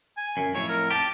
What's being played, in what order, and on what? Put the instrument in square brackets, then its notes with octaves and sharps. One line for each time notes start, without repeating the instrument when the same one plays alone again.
[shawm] G#5
[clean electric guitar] F#2
[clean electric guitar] F2 A2 [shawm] C#5
[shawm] A#4
[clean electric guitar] G4 [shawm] A5